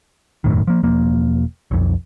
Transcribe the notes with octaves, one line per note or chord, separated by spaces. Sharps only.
E1 F#2 A2 D#3
F3 A#3
E1 F3 A#3
B1 F2